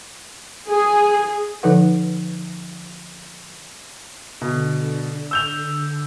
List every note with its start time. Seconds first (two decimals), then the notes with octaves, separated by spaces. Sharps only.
0.68 G#4 G#5
1.63 D3 F3 D#4 A4 B4 F#5
4.42 B2 D3
5.31 E6 G6 F7